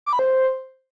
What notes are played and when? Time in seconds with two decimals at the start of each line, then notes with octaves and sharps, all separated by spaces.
0.06 D6
0.13 B5
0.19 C5